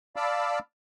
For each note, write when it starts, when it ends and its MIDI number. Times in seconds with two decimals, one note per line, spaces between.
0.16 0.59 74
0.16 0.59 77
0.16 0.59 81
0.16 0.59 83
0.16 0.59 86
0.16 0.59 88